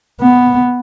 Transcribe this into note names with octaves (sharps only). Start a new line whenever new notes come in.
B3